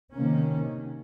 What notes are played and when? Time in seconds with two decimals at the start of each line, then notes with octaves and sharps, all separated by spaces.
0.13 C3 D#3 A#3 C#4